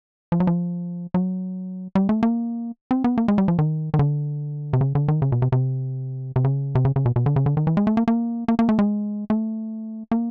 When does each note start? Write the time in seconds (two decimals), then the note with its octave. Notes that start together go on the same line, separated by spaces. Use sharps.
0.32 F3
0.40 F#3
0.47 F3
1.14 F#3
1.95 G3
2.09 A3
2.23 A#3
2.91 C4
3.04 B3
3.18 A#3
3.28 G#3
3.38 G3
3.48 F3
3.59 D#3
3.94 D#3
3.99 D3
4.73 C3
4.81 C#3
4.95 D3
5.08 D#3
5.22 C#3
5.32 B2
5.42 C3
5.52 C3
6.36 C3
6.44 C#3
6.75 C3
6.85 C#3
6.96 C#3
7.06 B2
7.16 B2
7.26 D3
7.36 C#3
7.46 D3
7.57 D#3
7.67 E3
7.77 G#3
7.87 A3
7.97 A#3
8.08 A#3
8.48 A#3
8.59 A#3
8.69 A3
8.79 G#3
9.30 A3
10.11 A#3